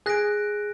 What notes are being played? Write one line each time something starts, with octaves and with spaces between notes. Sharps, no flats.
G#4 F#6 A#6 D7